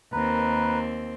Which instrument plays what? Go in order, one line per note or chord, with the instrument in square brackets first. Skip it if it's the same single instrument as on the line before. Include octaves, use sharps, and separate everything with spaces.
[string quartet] D#2 C4 [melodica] B4 [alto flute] A#5